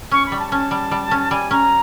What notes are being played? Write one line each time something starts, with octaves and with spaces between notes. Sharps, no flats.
C#4 C#6
B5
G3
A5
C#4 A5
G3
G3
C#4
G3 G#5
C#4 A#5